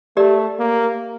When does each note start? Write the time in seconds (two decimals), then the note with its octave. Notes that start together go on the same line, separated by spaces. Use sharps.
0.17 A3 G4 A#4 D5
0.59 A#3